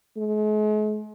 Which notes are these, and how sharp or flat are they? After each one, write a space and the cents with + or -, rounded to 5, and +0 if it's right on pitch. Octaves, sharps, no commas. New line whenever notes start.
G#3 +45